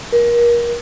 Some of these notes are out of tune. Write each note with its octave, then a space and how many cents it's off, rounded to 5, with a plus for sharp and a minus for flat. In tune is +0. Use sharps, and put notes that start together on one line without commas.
A#4 +30